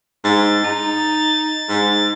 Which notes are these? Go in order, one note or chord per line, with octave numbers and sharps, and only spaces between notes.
G#2 A6
D#4
G#2